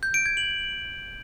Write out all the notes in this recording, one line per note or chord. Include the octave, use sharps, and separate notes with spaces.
G6
D7
G#6
F#7